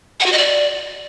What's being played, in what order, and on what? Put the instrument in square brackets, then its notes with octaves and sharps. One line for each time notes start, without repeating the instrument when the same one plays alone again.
[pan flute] F#5
F#4
D#5
D5